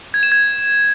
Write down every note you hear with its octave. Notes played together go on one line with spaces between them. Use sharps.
G#6
E7
G#6